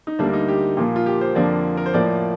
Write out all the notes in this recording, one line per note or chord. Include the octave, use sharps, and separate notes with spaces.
D#4
D2 D3 G3 A#3 D4
D#4
G4
A#2 F3 A#3
F4
G4
C5
F2 D3 F3 A#3 D5
A#4
C5
A2 F3 A#3 D5